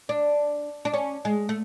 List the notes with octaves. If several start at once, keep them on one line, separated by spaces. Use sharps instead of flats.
D4
D4
C#4
G#3
A3